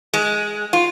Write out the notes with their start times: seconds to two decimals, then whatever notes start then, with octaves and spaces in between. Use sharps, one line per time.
0.14 G#3
0.73 F4